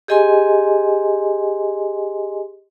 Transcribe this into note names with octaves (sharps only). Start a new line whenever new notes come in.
G4 G#4 D#5 G#5 C6